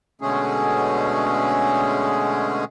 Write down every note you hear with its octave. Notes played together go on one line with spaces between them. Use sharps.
B2 D3 G#3 A3 C#4 G#4